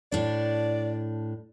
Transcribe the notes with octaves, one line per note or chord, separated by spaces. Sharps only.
A2 D4 D5